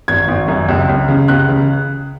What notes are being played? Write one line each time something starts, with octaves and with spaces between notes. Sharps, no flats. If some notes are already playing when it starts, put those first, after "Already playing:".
G#1 G#6
G#1
F#2
C#2
C#2
C#3
C#2 F#6
C#3